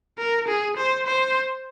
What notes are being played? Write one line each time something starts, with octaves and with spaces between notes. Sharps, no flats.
A#4
G#4
C5
C5